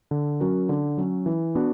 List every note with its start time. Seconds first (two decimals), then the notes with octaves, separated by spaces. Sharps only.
0.11 D3
0.40 F#3 C#4 F#4 A#4
0.69 D3
0.98 F#3 C#4
1.26 E3
1.55 B3 D4 F#4